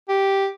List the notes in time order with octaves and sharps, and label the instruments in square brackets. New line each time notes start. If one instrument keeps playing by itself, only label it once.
[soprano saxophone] G4